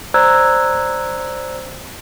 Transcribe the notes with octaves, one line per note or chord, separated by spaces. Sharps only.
C5 D5 A#5 E6 F#6 G#6